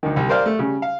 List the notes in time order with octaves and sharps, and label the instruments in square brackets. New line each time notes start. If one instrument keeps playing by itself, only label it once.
[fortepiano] D2 D#3
C2
A#4 C5 D5 F5 F6
A3
C#3 G3
F5